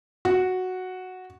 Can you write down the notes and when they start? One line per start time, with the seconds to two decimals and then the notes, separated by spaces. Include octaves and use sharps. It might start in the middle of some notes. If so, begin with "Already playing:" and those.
0.25 F#4